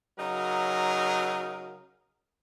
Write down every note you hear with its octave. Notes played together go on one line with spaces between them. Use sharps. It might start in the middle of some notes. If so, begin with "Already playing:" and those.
C#3 F#3 D#4 A#4